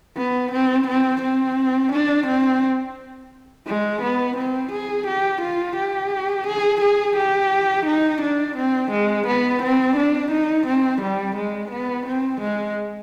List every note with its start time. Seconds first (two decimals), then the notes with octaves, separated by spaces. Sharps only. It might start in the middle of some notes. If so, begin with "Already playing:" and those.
0.17 B3
0.52 C4
0.88 C4
1.23 C4
1.93 D4
2.27 C4
3.67 G#3
4.02 B3
4.37 C4
4.72 G#4
5.07 G4
5.42 F4
5.76 G4
6.47 G#4
6.81 G#4
7.17 G4
7.86 D#4
8.22 D4
8.57 C4
8.91 G#3
9.27 B3
9.62 C4
9.96 D4
10.32 D#4
10.67 C4
11.02 G3
11.37 G#3
11.72 B3
12.06 C4
12.41 G#3